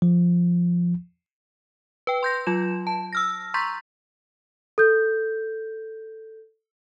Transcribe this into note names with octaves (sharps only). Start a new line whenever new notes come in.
F3
B4 G5
C6 G6 A#6
F#3 F4 E7
A5
E6 F6 A#6
A#5 C6 C#6 G6 A6 B6
A4 G6